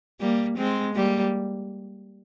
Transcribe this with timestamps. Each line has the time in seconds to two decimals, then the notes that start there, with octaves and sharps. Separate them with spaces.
0.20 G3 A#3
0.57 G#3 C4
0.95 G3 A#3